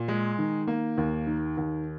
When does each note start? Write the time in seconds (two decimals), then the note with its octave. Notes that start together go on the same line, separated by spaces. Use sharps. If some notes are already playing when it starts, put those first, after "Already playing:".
Already playing: A#2
0.08 G#3
0.39 D#3
0.67 A#3
0.98 D#2
1.27 D#3
1.57 D#2